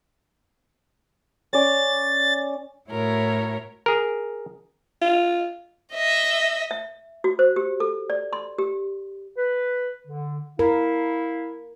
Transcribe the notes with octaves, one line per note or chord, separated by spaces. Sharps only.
C#4 D5 A6
A2 E4 F#4 A#4 C#5
G#4 A#4
F4
D#5 E5
E5
F#4
C5
G4
A4
D5
C6
G4
B4
D3
E4 A#4 F5